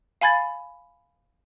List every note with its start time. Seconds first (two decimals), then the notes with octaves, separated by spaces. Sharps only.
0.21 F5 G#5 B5 G#6 A6